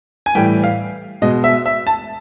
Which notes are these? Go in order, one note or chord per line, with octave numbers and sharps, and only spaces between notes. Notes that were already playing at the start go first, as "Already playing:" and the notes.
G#5
A2 E3 G3 G5
F5
B2 G#3 D#5
E5
E5
A5